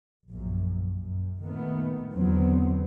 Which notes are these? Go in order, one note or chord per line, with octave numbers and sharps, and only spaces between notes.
A#1 F#2
F#2
A#2 D#3 A3 B3
E2 D3 F#3 B3 C4